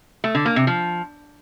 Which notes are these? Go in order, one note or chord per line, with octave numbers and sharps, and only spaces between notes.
A3
D3
A#3
C3
F3